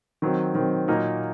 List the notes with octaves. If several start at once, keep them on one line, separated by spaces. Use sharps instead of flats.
D#3 F#3 C4
D#3 F#3 C4
A#2 F#3 A#3 D#4 A#4